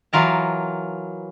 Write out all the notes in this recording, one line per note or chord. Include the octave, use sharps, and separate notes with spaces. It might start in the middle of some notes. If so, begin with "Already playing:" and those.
E3 F#3 F4 A#4 A5